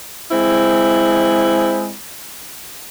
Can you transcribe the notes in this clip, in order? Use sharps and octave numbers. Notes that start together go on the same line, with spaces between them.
G#3 C4 E4